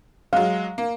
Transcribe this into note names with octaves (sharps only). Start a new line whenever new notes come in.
F#3 G#3 F5
A#3